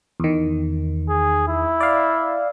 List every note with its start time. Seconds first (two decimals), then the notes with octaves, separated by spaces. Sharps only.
0.20 E2 D#3
1.09 G#4
1.48 E4
1.80 D5 F5